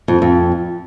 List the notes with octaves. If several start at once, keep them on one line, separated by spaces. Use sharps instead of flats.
F2
F2